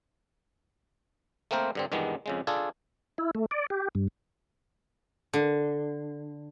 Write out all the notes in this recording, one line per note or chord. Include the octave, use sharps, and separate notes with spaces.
A3 A#3 C4 A#4 C5
G2 D3 C4
E2 G2 D#3 G#3 B3
F2 C#3 G#3
D4 F4 G#4 A4
E4
A3
D5
G4
G2
D3